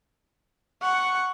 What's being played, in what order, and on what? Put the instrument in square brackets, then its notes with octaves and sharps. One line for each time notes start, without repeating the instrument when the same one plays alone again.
[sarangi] F#5 [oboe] C#6